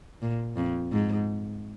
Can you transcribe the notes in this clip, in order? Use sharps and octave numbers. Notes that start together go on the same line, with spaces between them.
A#2
F2
G#2